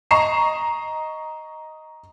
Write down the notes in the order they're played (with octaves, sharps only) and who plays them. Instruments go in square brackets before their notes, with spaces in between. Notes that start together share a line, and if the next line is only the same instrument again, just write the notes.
[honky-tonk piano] D#5 A#5 C#6 C7 E7